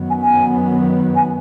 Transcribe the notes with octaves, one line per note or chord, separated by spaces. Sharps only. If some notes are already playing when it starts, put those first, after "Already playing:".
Already playing: F#2 D#3 F#3 B3
G#5
G#5
G#5